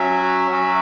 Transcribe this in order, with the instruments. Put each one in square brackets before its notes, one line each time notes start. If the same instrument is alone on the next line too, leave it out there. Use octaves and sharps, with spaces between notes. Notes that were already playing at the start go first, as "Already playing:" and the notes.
Already playing: [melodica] F#3 C#4 F#4 E5
F#3 C#4 F#4